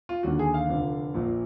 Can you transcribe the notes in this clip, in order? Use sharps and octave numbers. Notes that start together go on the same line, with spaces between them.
F4
D#2 D3 F#4
G#4
F5
F1 F2 D3
A#1 A#2